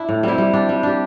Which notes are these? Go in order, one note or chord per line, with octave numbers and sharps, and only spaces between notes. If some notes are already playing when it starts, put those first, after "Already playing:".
Already playing: D4 E4
A2
G3 C4 E4
G3
D4 G4
G3
D4 G4